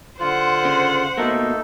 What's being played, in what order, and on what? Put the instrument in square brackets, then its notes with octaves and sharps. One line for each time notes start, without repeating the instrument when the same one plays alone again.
[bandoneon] D3 F4 [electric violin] C5 F#5
[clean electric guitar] C#3
[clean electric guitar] B2 A#3 [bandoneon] A3 D#4 A4